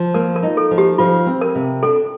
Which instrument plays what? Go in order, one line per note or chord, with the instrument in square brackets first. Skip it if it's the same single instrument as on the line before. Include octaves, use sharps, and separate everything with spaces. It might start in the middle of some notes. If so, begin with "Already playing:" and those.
Already playing: [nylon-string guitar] F3
[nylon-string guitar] A#3 [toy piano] A#4
[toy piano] A#4
[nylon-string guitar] D#4
[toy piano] A4
[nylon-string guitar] F3
[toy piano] G4
[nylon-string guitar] F3 [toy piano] F4
[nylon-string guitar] C4
[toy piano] A#4
[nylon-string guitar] C3
[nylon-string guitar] D4 [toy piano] A4